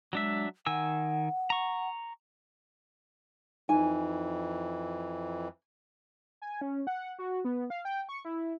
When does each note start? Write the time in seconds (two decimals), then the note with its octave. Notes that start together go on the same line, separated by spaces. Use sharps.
0.13 F#3 G#3 D4 E5
0.66 D#3 F#5 G#5 E6
1.50 A#5 C#6
3.69 F2 E3 D#4 G#5
6.42 G#5
6.61 C#4
6.87 F#5
7.19 F#4
7.45 B3
7.70 F5
7.85 G5
8.09 C#6
8.25 E4